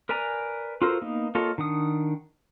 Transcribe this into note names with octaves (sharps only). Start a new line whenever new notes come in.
A#4 B4 D5 G#5 A#5
F4 F#4 A4 A#4 C5
A#3 B3 D#4
A#3 F4 A4 C#5 D#5
D#3 D4 F#5 D#6